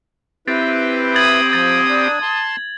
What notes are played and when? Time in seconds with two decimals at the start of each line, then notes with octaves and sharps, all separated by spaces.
0.48 C4 E4 G4 B4 A6
1.15 D#6 G#6 A6 F#7
1.53 F3 D#6 A6
1.88 D4
2.22 A5 C6